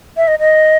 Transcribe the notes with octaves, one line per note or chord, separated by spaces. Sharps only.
E5
D#5
D#5